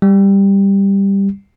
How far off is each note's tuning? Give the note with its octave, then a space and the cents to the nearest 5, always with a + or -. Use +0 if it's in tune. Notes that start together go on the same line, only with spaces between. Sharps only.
G3 +10